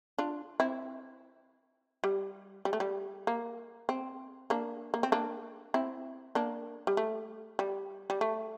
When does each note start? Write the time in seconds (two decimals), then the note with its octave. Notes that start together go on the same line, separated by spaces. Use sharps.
0.18 D4 F4
0.60 C4 E4
2.04 G3
2.65 G3
2.73 A3
2.80 G3
3.27 A#3
3.89 C4
4.50 A#3 D4
4.94 A#3
5.03 C4
5.12 A#3 D4
5.74 C4 E4
6.35 A#3 D4
6.87 G3
6.97 A3
7.59 G3
8.10 G3
8.21 A3